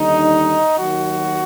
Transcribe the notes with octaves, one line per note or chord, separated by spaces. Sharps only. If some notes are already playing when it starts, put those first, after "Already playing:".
Already playing: D#2 D3 G3 D#4
D#2 D#3 F#3 F#4